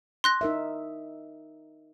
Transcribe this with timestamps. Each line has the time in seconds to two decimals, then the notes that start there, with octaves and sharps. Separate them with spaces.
0.24 C6 F#6 A#6
0.41 D#4 A#4 E5